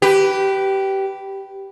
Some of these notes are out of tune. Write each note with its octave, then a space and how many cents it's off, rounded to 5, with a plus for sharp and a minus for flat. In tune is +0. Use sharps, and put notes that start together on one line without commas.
G4 -15 B4 +5